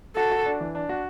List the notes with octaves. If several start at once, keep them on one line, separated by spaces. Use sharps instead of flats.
F#4 A4
F#4
D4
E3
D4
F#4